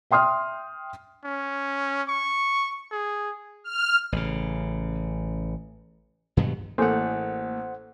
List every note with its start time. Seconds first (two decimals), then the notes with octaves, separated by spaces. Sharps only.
0.11 E5 G5 C6 D#6 F6
1.25 C#4
2.09 C#6
2.92 G#4
3.64 F6
4.12 A1 C#3
6.37 G2 B2 D#3 F#3
6.78 A1 A3 A#3 A4 C5 C#5 F#5 G#5